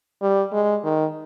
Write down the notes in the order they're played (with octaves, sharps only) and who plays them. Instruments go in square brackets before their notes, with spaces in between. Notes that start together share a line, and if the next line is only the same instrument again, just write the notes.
[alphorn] G3
G#3
D#3